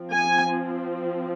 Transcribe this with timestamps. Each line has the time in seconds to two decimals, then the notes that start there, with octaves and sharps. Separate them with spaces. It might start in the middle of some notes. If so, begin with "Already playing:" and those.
Already playing: F3 C4
0.13 G#5